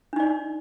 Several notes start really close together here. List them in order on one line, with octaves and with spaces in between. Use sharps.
D4 D#4 D5